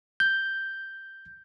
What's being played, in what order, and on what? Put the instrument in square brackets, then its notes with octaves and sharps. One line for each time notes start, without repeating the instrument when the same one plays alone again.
[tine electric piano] G6